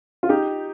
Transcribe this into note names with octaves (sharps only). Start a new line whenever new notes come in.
F4
D#4 G4